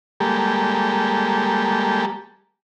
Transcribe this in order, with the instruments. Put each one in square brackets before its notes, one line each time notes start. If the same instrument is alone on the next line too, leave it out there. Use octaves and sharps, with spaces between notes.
[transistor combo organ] G3 G#3 A#3 G4 A4